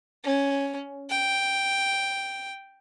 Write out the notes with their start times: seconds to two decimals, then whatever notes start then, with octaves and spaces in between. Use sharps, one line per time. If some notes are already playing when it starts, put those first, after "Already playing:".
0.24 C#4
1.09 G5